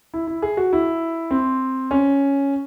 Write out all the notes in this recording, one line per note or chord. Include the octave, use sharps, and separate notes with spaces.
E4
E4
G#4
F#4
E4
C4
C#4